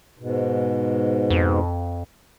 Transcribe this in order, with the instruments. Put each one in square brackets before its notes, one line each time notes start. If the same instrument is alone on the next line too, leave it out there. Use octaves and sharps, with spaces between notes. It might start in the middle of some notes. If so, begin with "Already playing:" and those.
[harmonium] G#2 B2
[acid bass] F2